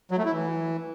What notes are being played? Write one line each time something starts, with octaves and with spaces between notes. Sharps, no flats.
F#3
A3
E4
E3